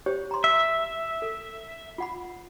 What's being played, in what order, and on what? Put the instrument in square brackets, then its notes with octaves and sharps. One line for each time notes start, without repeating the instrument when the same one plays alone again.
[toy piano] G4 C5 C#5
A#5 C6
[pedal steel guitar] E5
[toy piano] A4
F4 F#5 B5